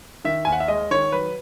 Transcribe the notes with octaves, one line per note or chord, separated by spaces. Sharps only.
D#3 E5
D#2 G#5
F#5
E5
G#3 D#5
D#3 C#5
F#3 B4